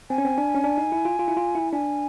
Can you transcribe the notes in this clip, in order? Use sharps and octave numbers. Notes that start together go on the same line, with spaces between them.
C4 G#5
C#4
C4
D4
C#4
D4
D#4
E4
F4
F4
E4
F4
E4
D4 G#5